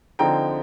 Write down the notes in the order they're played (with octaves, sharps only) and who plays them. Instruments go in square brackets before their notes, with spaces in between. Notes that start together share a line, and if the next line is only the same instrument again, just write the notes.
[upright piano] D3 F3 C4 D#4 G5 A#5